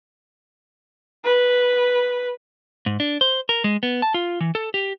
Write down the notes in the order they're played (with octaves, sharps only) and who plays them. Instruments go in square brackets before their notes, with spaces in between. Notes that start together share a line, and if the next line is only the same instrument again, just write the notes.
[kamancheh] B4
[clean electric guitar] G#2
D4
C5
A#4
G#3
B3
A5
F4
E3
A4
G4